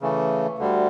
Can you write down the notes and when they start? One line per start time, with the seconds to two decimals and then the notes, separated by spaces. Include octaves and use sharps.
0.01 C#3 E3 A3
0.58 D2 D3 G3